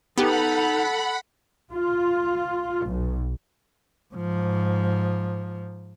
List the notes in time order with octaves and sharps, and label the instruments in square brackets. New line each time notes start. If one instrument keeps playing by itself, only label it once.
[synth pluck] B3 G4 [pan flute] D#4 [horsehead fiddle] A4 [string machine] F#5 B5
[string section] F4
B1
[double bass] G#2 F3